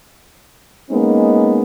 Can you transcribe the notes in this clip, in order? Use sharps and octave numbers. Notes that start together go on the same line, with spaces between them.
G#3 A#3 B3 C#4 D#4